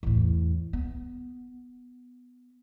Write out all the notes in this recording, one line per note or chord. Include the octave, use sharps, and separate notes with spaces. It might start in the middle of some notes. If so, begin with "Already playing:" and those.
E2 A2
B3